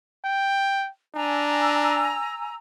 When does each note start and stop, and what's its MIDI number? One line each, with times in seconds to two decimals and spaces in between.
0.24 0.89 79
1.15 2.18 62
1.15 2.56 80
1.15 2.56 82
1.15 2.56 88